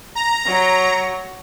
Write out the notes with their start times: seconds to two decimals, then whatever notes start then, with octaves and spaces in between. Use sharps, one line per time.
0.15 A#5
0.46 F#3